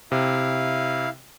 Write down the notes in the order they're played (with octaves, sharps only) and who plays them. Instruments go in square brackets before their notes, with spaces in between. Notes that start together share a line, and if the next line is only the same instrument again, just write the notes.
[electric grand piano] C3 [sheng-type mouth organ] E4 F5